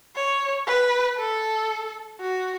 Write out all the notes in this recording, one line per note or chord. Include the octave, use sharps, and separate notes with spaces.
C#5
B4
A4
F#4